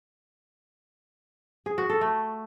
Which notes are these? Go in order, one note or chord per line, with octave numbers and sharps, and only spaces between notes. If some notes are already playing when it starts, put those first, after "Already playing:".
G#4
F#4
A4
A3